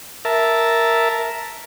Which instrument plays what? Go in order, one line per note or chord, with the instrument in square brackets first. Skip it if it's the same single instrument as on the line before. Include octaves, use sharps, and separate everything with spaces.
[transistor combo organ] A#4 E5 A5